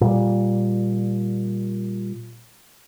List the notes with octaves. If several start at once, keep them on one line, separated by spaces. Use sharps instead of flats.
A#2 G3